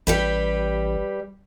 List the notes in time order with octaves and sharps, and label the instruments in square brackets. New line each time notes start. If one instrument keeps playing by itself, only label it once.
[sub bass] A1 [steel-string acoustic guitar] G3 G4 B4